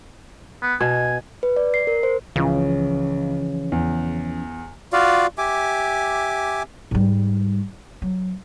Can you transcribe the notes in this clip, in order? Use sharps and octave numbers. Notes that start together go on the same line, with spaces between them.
B3
B2 G#5
B4
D5
C7
A#4
C5
C#2 C#3 E3 F3 C#4
E2
F4 F#4 D5 F5
G4 E5 G#5 D6
G#2 G3
F#3